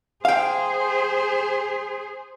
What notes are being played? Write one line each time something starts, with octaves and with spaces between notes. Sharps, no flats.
G#4 C5 F5 G5